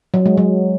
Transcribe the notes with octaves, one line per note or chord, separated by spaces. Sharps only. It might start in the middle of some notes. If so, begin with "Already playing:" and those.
F#3
G#3
F#3